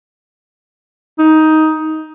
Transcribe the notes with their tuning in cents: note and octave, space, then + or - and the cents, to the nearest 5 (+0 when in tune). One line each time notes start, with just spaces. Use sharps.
D#4 +10